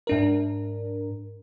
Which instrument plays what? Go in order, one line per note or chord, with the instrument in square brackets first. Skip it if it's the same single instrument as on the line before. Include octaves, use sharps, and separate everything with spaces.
[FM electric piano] G#2 D4 A#4